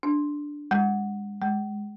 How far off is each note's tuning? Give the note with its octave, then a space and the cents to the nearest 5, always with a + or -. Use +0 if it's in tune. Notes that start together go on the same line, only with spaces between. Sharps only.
D4 +0
G#3 -35
G#3 +0